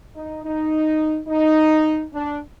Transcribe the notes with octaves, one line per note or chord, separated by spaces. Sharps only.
D#4
D#4
D#4
D4